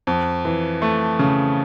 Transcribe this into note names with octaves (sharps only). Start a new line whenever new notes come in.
F2
E3
A3
C#3